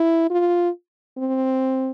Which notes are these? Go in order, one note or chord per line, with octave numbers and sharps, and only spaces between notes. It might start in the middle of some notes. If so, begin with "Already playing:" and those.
Already playing: E4
F4
C4